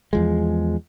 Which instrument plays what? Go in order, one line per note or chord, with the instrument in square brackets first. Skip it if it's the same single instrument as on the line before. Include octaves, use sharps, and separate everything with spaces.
[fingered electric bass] E2 F3 G#3